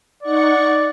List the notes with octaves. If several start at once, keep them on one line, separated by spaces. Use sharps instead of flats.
D#4 D5 F#5 C#6